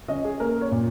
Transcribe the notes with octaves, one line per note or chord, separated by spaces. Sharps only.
C#4 D#5
G#4
A#3 A#4
C#5
A#2